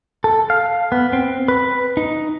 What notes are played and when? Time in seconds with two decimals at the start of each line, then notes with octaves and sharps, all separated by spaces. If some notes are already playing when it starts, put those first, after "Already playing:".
0.24 A4
0.50 F5
0.92 B3
1.13 C4
1.48 B4
1.97 D#4